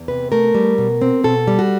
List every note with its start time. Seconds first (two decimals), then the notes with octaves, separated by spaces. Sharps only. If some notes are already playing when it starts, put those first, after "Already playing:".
Already playing: E2
0.08 C3 B4
0.32 A3 A#4
0.54 G3
0.78 B2
1.02 C4
1.24 B2 A4
1.47 G3
1.59 F#4